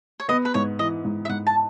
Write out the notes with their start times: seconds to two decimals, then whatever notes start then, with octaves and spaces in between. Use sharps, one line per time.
0.20 C#5
0.29 B3 D#5
0.45 B4
0.54 G#2 C#5
0.79 E3 D#5
1.05 G#2
1.25 E5
1.29 G#2 F#5
1.47 A5